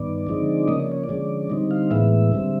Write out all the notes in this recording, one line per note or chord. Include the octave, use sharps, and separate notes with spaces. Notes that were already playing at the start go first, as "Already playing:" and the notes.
Already playing: G2 D#3 B3 D5
D3 F3 G#3 C4 D#4
C#3 F3 A#3 C#4 D#5
D5
C#5
D5
D3 F3 G#3 C#4
D3 G3 C4 D#4
F5
A2 E3 G#3 B3 E5
D3 G3 C4